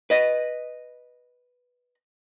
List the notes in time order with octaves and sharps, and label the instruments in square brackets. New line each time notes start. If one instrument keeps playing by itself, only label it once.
[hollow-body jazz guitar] B4 D#5